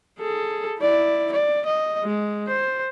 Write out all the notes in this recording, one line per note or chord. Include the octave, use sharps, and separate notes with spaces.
G#4 A4
E4 D5
D5
D#5
G#3
C5